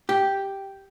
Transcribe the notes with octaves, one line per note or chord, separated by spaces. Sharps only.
G4